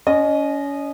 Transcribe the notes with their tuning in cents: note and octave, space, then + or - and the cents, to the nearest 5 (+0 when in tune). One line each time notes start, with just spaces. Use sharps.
C#4 +30 D#5 -15